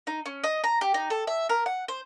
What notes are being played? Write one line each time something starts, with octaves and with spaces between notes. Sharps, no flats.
D#4
C#4
D#5
A#5
G4
D#4
A4
E5
A#4
F#5
C5